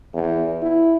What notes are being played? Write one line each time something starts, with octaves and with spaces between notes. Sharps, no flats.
E2
E4